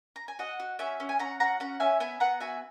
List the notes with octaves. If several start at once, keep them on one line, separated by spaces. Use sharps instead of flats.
A#5
G#5
F#4 D#5 F#5
F#4
C#4 E5 G#5
C#4
G#5
C#4 F#5 A#5
F#4 F#5 A#5
C#4 F#5 A#5
C#4 E5 G#5
B3 E5 G#5
B3 F#5 A#5
F#4 E5 G#5